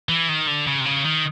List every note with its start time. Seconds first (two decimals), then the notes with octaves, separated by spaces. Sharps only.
0.09 E3
0.29 D#3
0.47 D3
0.67 C#3
0.80 C3
0.85 C#3
1.05 D#3